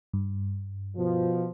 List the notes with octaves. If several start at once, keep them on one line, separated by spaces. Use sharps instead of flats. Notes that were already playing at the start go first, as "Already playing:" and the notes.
G2
B2 F3